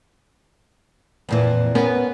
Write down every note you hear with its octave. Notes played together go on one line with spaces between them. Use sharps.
F2 A#2 E3
B3 C#4 A#4